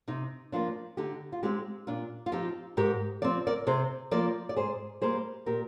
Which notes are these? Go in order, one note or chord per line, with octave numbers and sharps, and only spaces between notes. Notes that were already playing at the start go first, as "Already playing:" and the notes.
C3 D#4
F3 A#3 D4 F4
D3 D#4 G4
F4
G#3 C4 D#4 G4
A#2 D4 F4
F4
F3 C4 D#4 G4
G#2 G4 A#4
F3 C4 D5
A#4 D5
C3 G#4 C5
F3 A#3 A#4 D5
D5
G#2 G#4 C5
G3 A#3 G#4 C5
A#2 G4 A#4